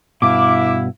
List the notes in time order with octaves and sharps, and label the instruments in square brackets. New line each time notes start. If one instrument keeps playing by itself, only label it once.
[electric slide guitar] G2 B2 [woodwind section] E4 [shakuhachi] F5 [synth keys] D6